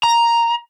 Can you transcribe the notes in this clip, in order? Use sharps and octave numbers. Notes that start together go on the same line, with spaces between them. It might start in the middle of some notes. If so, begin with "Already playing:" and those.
A#5